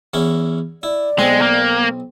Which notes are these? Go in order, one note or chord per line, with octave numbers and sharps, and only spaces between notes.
E2 C#4 E4
E4 D5
B1 G#3 C4
A#3